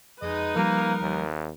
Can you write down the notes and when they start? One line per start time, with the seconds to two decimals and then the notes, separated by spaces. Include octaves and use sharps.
0.22 F2 G#3 D#4 B4 D#5
0.56 F3 G3 A#3 A#4
1.01 D#2